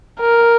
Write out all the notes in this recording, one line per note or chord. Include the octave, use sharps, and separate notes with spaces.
A#4